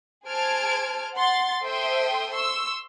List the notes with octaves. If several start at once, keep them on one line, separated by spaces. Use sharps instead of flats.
G#4 C5 A5 F6 G#6 D7
F#5 C6 A6
A4 C5 E5 G5 C6 D#6
C6 C#6 E6